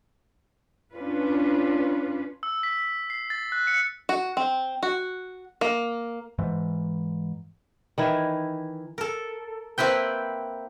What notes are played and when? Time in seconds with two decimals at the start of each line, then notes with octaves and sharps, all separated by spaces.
0.95 C#4 D4 F4 B4
2.43 E6
2.63 B6
3.10 C7
3.30 A6
3.52 F#6
3.67 C#7
4.09 F#4
4.37 C4
4.83 F#4
5.61 A#3
6.39 G#2 E3
7.98 D#3 E3 E4
8.98 A4 A#4
9.78 A#3 C4 E4 B4 G5